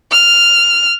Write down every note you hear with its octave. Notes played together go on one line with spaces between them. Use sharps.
F6